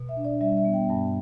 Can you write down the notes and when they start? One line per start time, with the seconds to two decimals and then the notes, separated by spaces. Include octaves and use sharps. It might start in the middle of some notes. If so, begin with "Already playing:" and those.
Already playing: B2
0.09 E5
0.17 D4
0.25 D5
0.41 G3 E5
0.57 E5
0.65 B3
0.73 G5
0.89 G2 A5